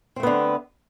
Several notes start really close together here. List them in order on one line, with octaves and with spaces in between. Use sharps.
C4 A3 B3 D3